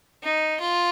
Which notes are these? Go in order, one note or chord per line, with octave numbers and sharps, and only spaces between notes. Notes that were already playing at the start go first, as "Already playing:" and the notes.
D#4
F4